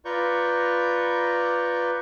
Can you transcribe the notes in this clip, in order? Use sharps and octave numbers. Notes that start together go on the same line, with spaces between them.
F4 B4 D5 A#5 C#6 G6